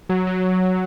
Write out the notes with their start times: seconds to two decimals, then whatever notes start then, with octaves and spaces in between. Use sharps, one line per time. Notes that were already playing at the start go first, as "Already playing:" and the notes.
0.09 F#3
0.27 F#3